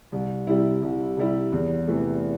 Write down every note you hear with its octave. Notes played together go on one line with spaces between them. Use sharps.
C2
C3 G3 E4
C2
C3 G3 E4
E2
C3 E3 A3